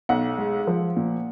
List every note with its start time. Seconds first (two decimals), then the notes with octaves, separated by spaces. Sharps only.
0.09 B1 F#5
0.38 G#3
0.67 F3
0.97 A#2